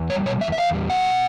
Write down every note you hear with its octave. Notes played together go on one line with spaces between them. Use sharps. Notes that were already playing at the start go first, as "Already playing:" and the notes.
Already playing: E2
G3 C#5
B2 C#5
E2 E5
E5
E2 F5
G3
B2 F#5